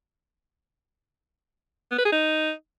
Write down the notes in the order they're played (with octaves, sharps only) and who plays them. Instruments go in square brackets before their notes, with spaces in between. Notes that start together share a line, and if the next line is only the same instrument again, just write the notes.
[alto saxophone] B3
B4
G#4
D#4